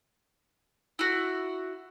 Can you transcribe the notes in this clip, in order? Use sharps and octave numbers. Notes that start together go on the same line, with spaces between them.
E4 F#4